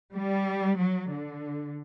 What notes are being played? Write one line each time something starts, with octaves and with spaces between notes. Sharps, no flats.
G3
F#3
D3